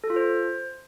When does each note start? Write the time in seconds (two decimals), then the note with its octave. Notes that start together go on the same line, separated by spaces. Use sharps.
0.04 A4
0.10 F4
0.16 C5